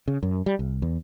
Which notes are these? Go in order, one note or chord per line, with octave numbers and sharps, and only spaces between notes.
C#3
F#2
G3
C2
E2